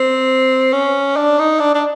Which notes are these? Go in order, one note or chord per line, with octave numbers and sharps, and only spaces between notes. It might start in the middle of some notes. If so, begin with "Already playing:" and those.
Already playing: C4
C#4
D4
D#4
D4
D4